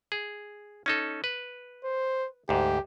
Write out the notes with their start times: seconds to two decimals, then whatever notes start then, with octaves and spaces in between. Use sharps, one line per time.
0.12 G#4
0.86 C#4 D#4 A4
1.24 B4
1.84 C5
2.49 D2 G#2 G4